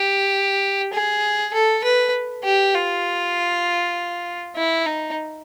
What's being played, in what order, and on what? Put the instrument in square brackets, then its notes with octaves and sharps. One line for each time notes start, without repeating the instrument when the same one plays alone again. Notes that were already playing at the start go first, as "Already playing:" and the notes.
Already playing: [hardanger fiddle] G4
G#4
A4
B4
G4
F4
E4
D#4